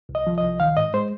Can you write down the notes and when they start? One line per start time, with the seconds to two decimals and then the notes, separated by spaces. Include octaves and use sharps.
0.09 C2
0.15 D#5
0.27 F3
0.38 D#5
0.43 C2
0.60 D#3 F5
0.77 G#2 D#5
0.94 G#3 C5